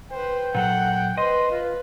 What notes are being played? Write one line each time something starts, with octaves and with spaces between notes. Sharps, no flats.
B4 C5 G5
A#2 F#3 A4 F#5
B4 C5 D#5 C6
F4 B4